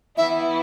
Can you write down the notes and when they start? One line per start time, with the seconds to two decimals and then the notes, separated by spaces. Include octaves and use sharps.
0.17 E3 B3 E4 E5